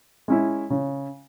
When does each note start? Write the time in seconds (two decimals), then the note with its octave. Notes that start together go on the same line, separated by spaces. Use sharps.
0.28 G#3 C#4 E4
0.70 C#3